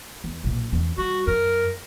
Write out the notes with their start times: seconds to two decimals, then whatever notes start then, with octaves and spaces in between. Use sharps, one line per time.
0.24 E2
0.44 B1 A#2
0.72 E2 C#4
0.98 G3 F#4
1.27 F#2 A#4